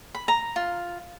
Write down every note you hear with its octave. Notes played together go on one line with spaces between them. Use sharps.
B5
A#5
F4